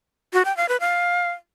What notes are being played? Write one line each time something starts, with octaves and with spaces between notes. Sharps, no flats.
F#4
G5
F5
B4
F5